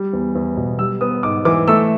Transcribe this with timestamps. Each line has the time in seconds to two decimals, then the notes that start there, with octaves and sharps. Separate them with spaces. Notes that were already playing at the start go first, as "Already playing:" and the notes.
Already playing: G3
0.13 E2
0.35 E2
0.57 B2
0.79 G3 E6
1.01 B3 D#6
1.23 G#2 D6
1.45 E3 D6
1.68 A3 E6